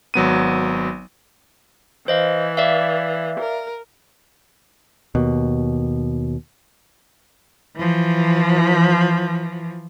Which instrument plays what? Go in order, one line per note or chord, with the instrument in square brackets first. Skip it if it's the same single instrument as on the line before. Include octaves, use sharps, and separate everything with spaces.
[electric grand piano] G#1 F#3 B3 D#7
[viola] E3 [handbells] C5 D#5 F5
[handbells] D5 E5 F5
[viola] A#4
[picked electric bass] D#2 B2
[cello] E3 F3